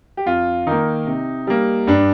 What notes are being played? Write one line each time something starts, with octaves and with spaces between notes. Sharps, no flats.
G4
F2 F4
D#3 A#3 D#4
C3
G3 A#3
G2 D4